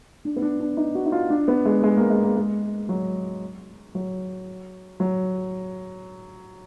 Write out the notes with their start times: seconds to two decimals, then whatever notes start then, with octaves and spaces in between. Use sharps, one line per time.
0.25 D4
0.36 B3
0.42 D4
0.60 D4
0.77 D#4
0.95 F#4
1.06 D#4
1.12 F4
1.30 D4
1.48 B3
1.65 G#3
1.83 G#3
1.97 A#3
2.10 G#3
2.24 A#3
2.36 G#3
2.89 F#3
3.95 F#3
5.00 F#3